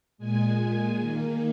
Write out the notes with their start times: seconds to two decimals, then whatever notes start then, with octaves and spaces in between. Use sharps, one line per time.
0.18 A#2 G#3 G#5
0.59 G#5
1.00 D#3 A#3